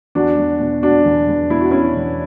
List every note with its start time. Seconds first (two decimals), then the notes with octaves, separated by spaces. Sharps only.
0.15 E2 D4 F#4
0.38 E2
0.60 B2
0.82 B2 D4 F#4
1.06 E2
1.28 E2
1.50 B2 E4
1.61 F#4
1.71 B2 C#4 E4
1.97 E2